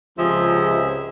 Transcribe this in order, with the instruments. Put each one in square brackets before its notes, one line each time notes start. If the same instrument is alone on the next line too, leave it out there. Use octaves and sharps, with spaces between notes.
[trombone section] C#2 [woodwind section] G#2 C3 [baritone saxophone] F3 [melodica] G#4 E5 E6